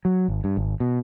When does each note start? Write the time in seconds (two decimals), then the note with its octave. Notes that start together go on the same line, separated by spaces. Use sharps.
0.05 F#3
0.28 G#1
0.44 G2
0.57 G#1
0.80 B2